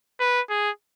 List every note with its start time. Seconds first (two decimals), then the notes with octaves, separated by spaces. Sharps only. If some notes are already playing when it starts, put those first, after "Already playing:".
0.20 B4
0.49 G#4